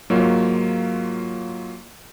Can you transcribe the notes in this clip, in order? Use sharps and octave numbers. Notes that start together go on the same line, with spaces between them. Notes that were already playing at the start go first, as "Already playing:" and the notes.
G#2 F#3 A#3 F4 C#5